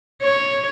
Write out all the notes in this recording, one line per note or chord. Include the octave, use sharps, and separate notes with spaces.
C#5